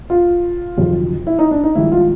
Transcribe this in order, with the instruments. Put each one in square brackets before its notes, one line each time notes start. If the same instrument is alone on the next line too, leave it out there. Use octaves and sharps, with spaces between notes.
[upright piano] F4
G1 F2 C3 D#3 F#3
E4
D#4
D4
D#4
A#1 G#2 D#3 G3 E4
F4